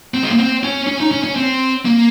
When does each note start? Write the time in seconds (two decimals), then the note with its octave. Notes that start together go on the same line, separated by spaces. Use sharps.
0.14 C4
0.23 G#3
0.31 A#3
0.38 C4
0.63 C#4
0.87 C#4
1.00 D#4
1.11 C#4
1.24 C#4
1.36 C4
1.85 A#3